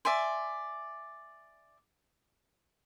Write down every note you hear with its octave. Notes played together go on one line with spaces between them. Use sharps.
D5 E5 G#5 C6